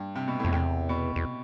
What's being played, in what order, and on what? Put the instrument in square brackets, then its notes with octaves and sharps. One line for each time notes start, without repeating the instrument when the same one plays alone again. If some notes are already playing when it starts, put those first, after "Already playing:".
Already playing: [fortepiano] G2
C3
B2
[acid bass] F2 [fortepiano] A2
[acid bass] E2 [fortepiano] C3
[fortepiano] B2
[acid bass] E2